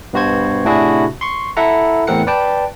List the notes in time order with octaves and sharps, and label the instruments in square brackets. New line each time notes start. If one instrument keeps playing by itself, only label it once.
[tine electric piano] G2 B2 F#4 C5 G#6
A2 C3 D4 E4 F#4 G#4
C6 C#6
E4 A4 E5 F#5 A#5
E2 A2 C4 A#4 F#5 C#7
B4 D5 G5 A5